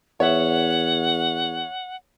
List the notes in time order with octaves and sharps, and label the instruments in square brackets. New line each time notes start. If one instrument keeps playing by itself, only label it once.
[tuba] E2 [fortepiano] C#5 E5 [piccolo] F#5